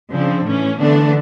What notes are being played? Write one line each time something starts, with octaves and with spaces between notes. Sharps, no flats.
C#3 F3 C4 D4
A2 E3 C#4
D3 E3 A3 B3 D4